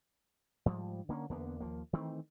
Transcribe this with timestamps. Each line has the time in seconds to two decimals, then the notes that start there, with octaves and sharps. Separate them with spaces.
0.66 G#2 F3 G3
1.09 D3 A#3 C4 C#4
1.30 E2 D3 A#3 B3
1.60 D#2 F3 A#3
1.93 D#3 E3 A3 C4